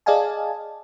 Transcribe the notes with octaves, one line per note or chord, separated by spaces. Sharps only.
G#4 D5 D#5 F5 G#5 A5